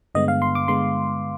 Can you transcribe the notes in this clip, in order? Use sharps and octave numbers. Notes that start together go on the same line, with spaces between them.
G2 D3 G#3 B3 D#5
F5
C6
D6
D3 G#3 B3 C6